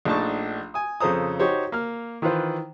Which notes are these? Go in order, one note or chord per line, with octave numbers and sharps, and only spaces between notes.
A#1 A3 D4 D#4 A5 C#6
G#5 D#6
F2 C#3 A4 C5 A#5 D#6
D#4 F#4 G4 C5 C#5
A#3 F6
D#3 E3 F4 B4 C5